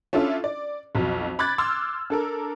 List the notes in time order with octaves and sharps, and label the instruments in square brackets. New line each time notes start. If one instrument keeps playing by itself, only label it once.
[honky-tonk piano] C#4 D4 E4 F4 A4
D5
B1 F2 F#3
B5 D6 F#6 G#6 A6
C6 D6 E6 F6
D4 A4 A#4